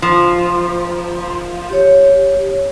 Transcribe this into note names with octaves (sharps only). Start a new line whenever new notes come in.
F3
G4 C#5